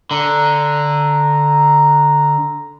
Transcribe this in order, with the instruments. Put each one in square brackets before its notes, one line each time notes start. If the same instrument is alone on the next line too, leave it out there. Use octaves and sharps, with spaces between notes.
[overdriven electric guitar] D3 [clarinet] A#5